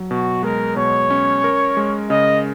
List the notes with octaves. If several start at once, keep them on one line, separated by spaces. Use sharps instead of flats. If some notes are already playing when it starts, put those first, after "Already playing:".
Already playing: F#3
B2 F#4
G#3 A#4
B2 C#5
C#4
A#4
G#3
C#3 D#5